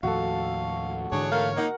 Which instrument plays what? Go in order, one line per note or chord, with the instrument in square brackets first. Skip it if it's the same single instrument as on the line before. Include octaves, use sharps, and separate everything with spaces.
[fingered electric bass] D#2 A2 F3 [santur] F#4 A4 [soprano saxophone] F5
[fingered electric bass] G#2 D3 E3 [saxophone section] D4 F#4 G#4 [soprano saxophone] C#5
[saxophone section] A3 F5 [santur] A#4
[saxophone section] A#3 D#4 [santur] F#5